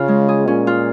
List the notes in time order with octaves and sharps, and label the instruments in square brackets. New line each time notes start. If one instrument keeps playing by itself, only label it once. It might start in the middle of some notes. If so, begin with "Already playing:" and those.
Already playing: [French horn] C#3 [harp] C#4 F4 G#4
[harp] G#3
G#4
[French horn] A#2 [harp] C#4
[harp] F4